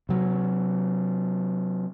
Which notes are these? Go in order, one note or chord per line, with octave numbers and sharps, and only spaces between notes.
C3 F#3